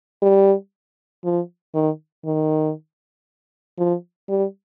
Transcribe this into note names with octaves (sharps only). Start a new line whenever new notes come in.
G3
F3
D#3
D#3
F3
G3